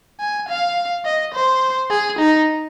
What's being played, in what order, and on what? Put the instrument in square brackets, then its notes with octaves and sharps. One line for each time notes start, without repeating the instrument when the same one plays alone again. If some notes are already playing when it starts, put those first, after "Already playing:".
[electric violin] G#5
F5
D#5
C5
G#4
D#4